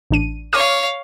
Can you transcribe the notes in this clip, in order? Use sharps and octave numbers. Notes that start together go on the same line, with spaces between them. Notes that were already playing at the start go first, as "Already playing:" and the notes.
A1 D4 D#7
C#5 F5 D6 F6 D#7